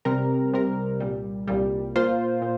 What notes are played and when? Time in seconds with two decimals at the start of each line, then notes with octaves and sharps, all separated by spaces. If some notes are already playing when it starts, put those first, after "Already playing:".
0.05 C2 C3 G3 C4 A#4
0.53 C2 C3 G3 C4 A#4
1.00 C2 A#2 G3
1.48 C2 A#2 G3
1.96 A#2 A#3 F4 C5
2.42 A#2